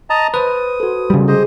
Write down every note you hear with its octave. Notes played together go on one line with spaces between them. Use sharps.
D#5 A5 A#5
B4 C5 D#6
F#4 A4
C#3 G3
G#4 C5 D#5